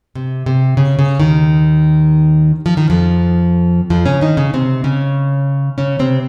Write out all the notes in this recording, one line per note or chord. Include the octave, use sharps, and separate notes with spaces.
C3
C3
C#3
C#3
D#2 D#3
F3
D#3
F2 F3
F2 F3
C#3 C#4
D#3 D#4
C#3 C#4
C3 C4
C#3 C#4
C#3 C#4
C3 C4